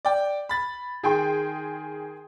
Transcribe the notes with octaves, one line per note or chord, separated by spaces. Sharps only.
D5 G5
B5 A6
D#3 G#4 G5 C6